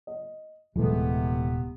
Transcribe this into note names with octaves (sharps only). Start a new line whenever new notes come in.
D#5
D#1 C3 E3 G#3 A3 B3